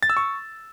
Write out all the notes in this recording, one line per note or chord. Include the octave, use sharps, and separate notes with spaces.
A6
E6
C#6